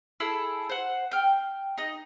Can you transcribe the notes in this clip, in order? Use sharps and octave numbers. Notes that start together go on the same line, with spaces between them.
E4 G#4 A4 E6
C5 F#5
G5 F6
D#4 D#5